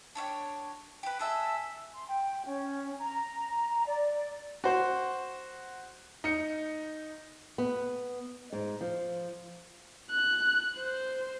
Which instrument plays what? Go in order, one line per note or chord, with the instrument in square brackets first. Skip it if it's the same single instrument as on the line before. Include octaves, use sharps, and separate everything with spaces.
[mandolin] D4 C#5 E5 G5
G4 B4
G#4 A4 E5
[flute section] C6
G5
C#4
A#5
D5
[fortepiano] F#4 C5
[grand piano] D#4 C#7
[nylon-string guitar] B3
G#2
F3
[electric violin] F#6
C5